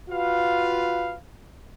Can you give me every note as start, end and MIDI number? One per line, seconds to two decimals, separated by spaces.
0.10 1.15 65
0.10 1.15 66
0.10 1.15 71
0.10 1.15 77